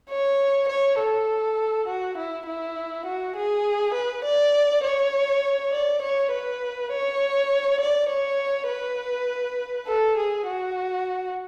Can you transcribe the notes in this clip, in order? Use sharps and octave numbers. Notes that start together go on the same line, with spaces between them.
C#5
C#5
A4
F#4
E4
E4
F#4
G#4
B4
D5
C#5
D5
C#5
B4
C#5
D5
C#5
B4
A4
G#4
F#4